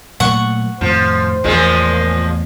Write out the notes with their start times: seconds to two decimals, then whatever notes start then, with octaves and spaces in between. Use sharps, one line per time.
0.20 A#2 F#3 A3 F#5 C#6
0.81 F2 A2 D#3 F3 C5
1.44 A1 E2 A#2 F3 G#3